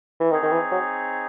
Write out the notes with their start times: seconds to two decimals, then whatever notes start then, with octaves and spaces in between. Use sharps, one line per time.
0.20 E3
0.31 D#3 C4 D#4 G#4 C#5
0.43 D#3
0.51 E3
0.72 F#3